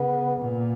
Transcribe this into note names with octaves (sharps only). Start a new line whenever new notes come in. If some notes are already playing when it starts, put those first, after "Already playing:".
Already playing: C#3 B3
A#2